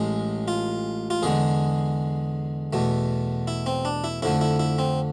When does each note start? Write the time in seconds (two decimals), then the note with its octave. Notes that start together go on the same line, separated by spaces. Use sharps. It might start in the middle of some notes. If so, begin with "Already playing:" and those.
Already playing: A1 A2 G#3 G#4
0.48 F4
1.10 F4
1.22 E2 D3 G#3 G#4
2.73 E2 B2 A3
3.47 E4
3.66 C4
3.85 D4
4.04 E4
4.22 F2 D3 A3 E4
4.41 E4
4.59 E4
4.79 C4